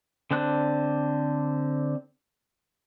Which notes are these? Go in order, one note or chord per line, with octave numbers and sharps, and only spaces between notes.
D3 C4 D4 F#6